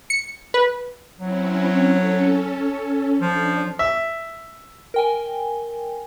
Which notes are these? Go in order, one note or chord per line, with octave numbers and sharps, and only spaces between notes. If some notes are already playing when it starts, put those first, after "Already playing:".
C#7
B4
F#3 C4 C#4 E4
C#4 A4
F3 D4
E5
A#4 G5 G#5